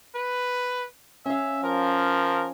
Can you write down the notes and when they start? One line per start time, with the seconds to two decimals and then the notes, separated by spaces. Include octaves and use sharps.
0.15 B4
1.26 C#4 E5 F5
1.64 F3 A#4